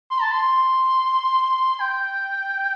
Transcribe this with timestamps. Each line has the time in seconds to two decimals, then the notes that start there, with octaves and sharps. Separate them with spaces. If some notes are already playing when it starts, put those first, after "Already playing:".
0.11 C6
0.21 A5
0.31 C6
1.81 G5